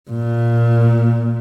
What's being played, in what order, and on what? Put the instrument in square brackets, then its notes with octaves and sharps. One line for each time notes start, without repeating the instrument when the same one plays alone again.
[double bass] A#2